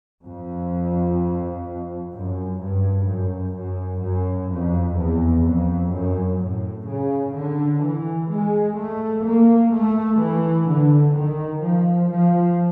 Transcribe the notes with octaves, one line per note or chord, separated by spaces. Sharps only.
F2
F#2
G2
F#2
F#2
F#2
F2
E2
F2
F#2
A2
C#3
D3
E3
G#3
A3
A#3
A3
E3
D3
D#3
F3
F3